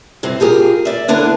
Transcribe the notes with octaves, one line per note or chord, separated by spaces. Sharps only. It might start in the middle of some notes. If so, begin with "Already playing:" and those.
G2 C3 C4
F4 G4 G#4 A#4
D5 E5
D3 B3 D4 E4 A#4